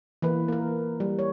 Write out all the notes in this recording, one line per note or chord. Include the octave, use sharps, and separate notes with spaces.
E3 A#3 B4
A#3 A#4
G3
C#5